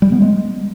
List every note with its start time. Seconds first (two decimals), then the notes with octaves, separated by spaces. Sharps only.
0.02 G3
0.12 B3
0.22 G#3